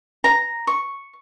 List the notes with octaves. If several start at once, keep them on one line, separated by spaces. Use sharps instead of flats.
A#5
C#6